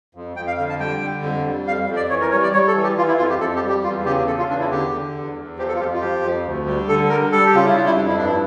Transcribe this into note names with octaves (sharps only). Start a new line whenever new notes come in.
F2
F2 G5
F5
D3 F5
A5
G3 G5
D3
F2
G3
F2 F5
F2
D5
E3 C#5
A#4
G3 C#5
D5
G3 C#5
A4
E3
G4
E3 F4
E4
F2 F4
G4
F2 A4
G4
G3
G4
E2 F4
C#3 G4
C#3 A4
F4
E2 D4
E4
D3 G4
D3
E2
E2
F3 G4
A4
F4
F2 G4
F4
F3 G4
F2
D2
G3
D3 A4
G3 A#4
G3 A4
G4
C#3 F4
E4
G3 D4
E4
F2 D4
E4
G2 D4
E4